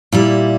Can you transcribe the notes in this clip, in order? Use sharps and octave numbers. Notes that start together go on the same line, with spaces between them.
A#2 G3 E4